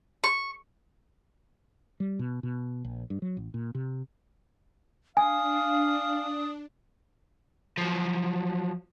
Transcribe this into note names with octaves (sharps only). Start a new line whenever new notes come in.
C#6
G3
B2
B2
A#1
G2
F#3
A1
A#2
C3
D4 F5 G#5 D#6
F3 F#3